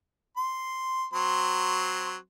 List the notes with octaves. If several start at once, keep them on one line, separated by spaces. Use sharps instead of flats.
C6
F#3 C4 C6